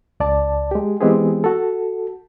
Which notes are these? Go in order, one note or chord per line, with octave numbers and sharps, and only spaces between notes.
C#2 D5 A5
G#3 G4
E3 G#3 B3 C4 G4 G#4
F#4 A4